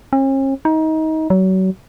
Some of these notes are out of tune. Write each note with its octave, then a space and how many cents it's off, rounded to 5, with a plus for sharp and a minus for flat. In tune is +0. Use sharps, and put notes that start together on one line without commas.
C#4 -45
D#4 +25
F#3 +30